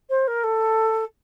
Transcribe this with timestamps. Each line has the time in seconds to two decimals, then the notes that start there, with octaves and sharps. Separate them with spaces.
0.09 C5
0.27 A#4
0.44 A4